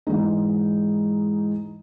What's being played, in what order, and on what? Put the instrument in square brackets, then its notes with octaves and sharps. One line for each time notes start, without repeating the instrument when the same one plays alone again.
[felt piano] G#2 E3 G#3 D#4